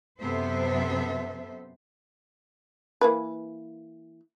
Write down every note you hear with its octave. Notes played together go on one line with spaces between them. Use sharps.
F#2 C3 B3 A4 C5 E5
E3 A#3 B4